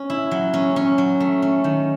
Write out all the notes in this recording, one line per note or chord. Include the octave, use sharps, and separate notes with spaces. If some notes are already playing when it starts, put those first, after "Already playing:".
Already playing: C#4
E4
F#3
C#4
C#4
F#3
A3
C#4
D#3